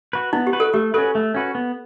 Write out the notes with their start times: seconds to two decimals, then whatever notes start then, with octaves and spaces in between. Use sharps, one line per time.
0.13 F#4 B4
0.33 B3 E4
0.47 G4
0.53 F#4 B4
0.60 A4
0.74 A3 G4
0.94 C#4 F#4 A4 B4
1.15 A3
1.34 C#4 F#4 B4
1.55 B3